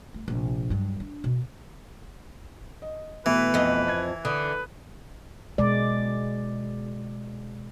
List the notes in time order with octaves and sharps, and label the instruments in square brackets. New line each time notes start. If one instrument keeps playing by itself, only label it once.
[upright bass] A3
A#1 C3
G2 F#3
D4
B2
[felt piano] D#5
[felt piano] B2 A3 B3 [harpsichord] E3 [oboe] B4
[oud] F2 D#5
[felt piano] G#6
[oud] D3 [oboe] B4 [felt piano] D#6
[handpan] B2 G#3 D5